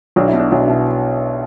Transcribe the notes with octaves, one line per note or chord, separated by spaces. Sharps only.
B1 D4
E4
B2
D4
B1 E4
D4
B2 E4